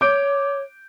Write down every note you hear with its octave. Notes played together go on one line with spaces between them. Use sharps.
C#5 D6 G6 D7